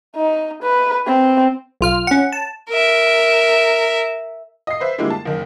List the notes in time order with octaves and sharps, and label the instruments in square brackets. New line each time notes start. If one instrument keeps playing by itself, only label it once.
[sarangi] D#4
B4
C4
[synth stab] B1 F4 F6
C#4 F#5
A5
[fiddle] A#4 E5
[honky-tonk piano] D#5 C7
B4 C5 E5
D3 G3 G#3 A#3 E4
A5
F#1 D#3